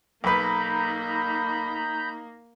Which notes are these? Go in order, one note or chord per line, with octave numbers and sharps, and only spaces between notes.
B1 A#3 D#4 B4 A#5 B5 G6